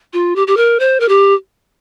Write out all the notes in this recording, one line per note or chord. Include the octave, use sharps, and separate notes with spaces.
F4
G4
G4
A#4
C5
A#4
G4